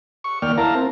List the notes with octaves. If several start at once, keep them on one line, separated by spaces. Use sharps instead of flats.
C#6
D#2 A#3 D5 G5 F6
E4 A#4 F5 A5 A#5
C4